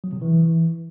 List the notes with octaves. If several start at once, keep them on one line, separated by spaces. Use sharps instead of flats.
F#3
C3
E3